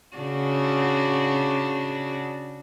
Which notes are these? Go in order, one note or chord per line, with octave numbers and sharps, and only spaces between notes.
C#3 D4 F#4